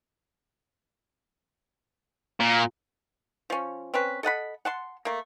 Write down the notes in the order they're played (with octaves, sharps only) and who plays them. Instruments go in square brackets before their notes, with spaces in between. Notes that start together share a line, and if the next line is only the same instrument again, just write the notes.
[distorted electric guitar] A#2
[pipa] F3 C#4
C4 C#4 B4
A4 D#5 F#5 B5
F#5 A5 C6
A3 A#3